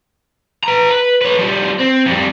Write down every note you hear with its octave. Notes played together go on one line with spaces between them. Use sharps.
B4 A#5
B4
B4 C#5
F3 G3
C4
F2 G3